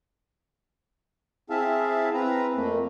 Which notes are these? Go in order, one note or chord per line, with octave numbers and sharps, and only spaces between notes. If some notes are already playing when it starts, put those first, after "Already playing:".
C4 E4 G#4 E5 F5 A5
C4 B4 A#5
F2 A3 A#3